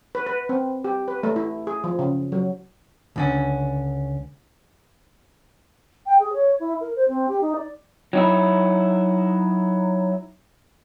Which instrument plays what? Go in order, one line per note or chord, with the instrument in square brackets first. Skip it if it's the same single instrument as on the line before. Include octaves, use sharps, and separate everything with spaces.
[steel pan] B4
B4
C4
G4
B4
A3
E4
G#4
F3
C#3
F#3
[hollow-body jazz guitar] C#2 D3 C#4
[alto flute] G5
G#4
C#5
E4
A#4
C5
C4
G4
D#4
D5
[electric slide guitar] F#3 D#4 E4